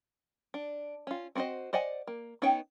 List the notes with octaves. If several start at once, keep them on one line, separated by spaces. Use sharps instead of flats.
D4
C#4 F4
C4 F#4 A4 C5 D#5
C5 D5 D#5 F#5 G#5
A#3
B3 C#4 D#4 C#5 G5